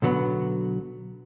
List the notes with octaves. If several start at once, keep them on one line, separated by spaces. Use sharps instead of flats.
B1 D3 F#3 B3